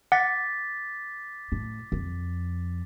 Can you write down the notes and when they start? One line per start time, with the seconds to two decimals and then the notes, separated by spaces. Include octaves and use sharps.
0.12 F#5 D6 A6 B6
1.52 A2
1.92 F2